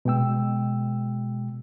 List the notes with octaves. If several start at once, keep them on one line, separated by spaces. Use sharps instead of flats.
B2 G#3 G5 E6